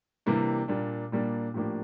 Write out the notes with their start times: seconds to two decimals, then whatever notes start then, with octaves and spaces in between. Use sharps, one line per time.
0.26 C3 E3 G3 A#3 D4
0.68 A#2 G3 A#3 D4
1.12 A#2 G3 A#3 D4
1.54 A2 F3 A#3 D4 G4